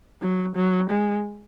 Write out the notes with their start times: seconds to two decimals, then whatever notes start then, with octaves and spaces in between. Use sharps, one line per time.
0.22 F#3
0.56 F#3
0.90 G#3